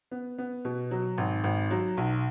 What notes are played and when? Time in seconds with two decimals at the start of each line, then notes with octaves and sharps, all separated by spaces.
0.11 B3
0.38 B3
0.65 B2
0.91 F#3
1.18 G#1
1.44 G#1
1.71 F#3
1.97 B1